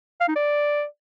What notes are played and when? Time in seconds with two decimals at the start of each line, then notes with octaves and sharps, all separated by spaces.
0.21 F5
0.28 D#4
0.36 D5